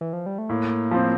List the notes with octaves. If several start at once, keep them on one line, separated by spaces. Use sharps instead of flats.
E3
F3
G3
A3
A2 A#3
F3 C4